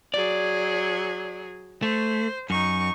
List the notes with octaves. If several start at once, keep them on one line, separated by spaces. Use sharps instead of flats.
F#3 G#4 D5
A3 C5
F#2 D#4 C#6